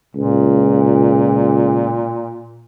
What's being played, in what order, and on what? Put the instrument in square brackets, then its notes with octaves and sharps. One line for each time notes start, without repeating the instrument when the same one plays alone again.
[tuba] C#2 [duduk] A#2